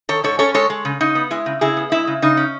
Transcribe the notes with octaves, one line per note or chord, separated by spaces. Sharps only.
D#3 A4 C#5
G#2 A4 C#5
C#4 A4 C#5
G#3 A4 C#5
G#3
C#3
C#3 D#4
B3
G#3 E4
C#3
C#3 E4 G#4
B3
G#3 E4
C#3
C#3 D#4
C#4